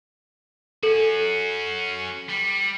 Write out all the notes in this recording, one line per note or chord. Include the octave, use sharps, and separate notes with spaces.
C#4 F#4 A4
G3